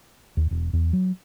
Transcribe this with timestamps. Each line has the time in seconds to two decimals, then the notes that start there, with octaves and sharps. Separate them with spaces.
0.37 D#2
0.51 E1
0.73 E2
0.93 F#3